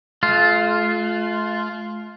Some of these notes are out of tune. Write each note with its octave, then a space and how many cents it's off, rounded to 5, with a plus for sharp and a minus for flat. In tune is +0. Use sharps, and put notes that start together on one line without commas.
A3 -40 F4 +0